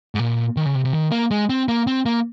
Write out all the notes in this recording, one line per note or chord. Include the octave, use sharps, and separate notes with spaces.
G#2
A#2
D#3
C#3
C3
C3
D#3
A#3
G#3
C4
A#3
C4
A#3